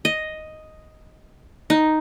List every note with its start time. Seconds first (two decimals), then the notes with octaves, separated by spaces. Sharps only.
0.05 D#5
1.70 D#4